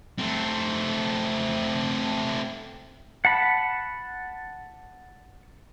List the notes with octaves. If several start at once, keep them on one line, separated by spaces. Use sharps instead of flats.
A3 C4
F#5 A5 B5